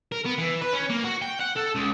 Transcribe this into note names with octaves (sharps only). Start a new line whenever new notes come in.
A#4
B3
E3
B4
C#4
A#3
F#4
G5
F#5
A4
C#2